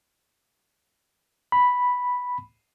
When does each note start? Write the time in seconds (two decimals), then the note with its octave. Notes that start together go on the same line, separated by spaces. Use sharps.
1.52 B5